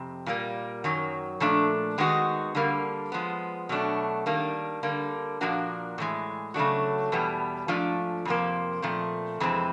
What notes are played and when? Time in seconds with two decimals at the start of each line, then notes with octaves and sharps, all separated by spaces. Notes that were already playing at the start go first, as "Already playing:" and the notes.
Already playing: F2 C3
0.26 A#2 G3 A#3
0.84 F#2 D#3 F#3
1.40 A#2 F3 A3 D4
1.98 D#3 G#3 B3 D#4 F#4
2.55 D3 G3 A#3
3.12 F3 G#3 B3
3.69 B2 F#3 A3 D4
4.26 D#3 G3 A#3 D4
4.83 D3 G3 A#3
5.41 A#2 F3 A#3 D4 F#4
5.98 A2 E3 G#3
6.54 C#3 F#3 A3 D4 F#4
7.12 E2 B2 G3 B3
7.68 G#2 F3 A3 D4 F4
8.25 F2 C3 F3 A#3
8.82 A#2 F3 A3 C4
9.40 F2 C3 E3 G#3 C4